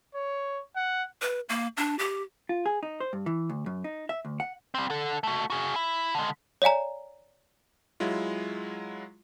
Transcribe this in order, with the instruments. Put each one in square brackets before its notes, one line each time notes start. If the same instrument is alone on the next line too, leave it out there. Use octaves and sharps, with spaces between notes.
[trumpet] C#5
F#5
[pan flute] B4
A#3
D4
G4
[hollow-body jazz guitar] F4
G#4
D#4
C5
G2
E3
D2
F#2
D#4
E5
D2
F#5
[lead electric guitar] G3 C4
D3 A4
A3 F#4
F#4 G#4
E4
D3 G#3
[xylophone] C#5 D5 F5 G#5 A#5
[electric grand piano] F#3 G#3 E4 F4